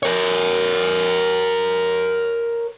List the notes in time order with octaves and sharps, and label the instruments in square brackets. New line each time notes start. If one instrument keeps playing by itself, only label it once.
[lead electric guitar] A#4 C#5